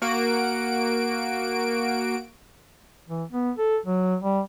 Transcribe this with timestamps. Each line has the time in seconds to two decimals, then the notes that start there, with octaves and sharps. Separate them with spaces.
0.02 A#3 F#4 D7
3.09 E3
3.32 B3
3.58 A4
3.86 F#3
4.21 G3